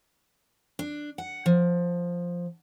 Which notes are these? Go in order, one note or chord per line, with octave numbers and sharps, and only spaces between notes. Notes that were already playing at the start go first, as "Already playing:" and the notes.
D4
F#5
F3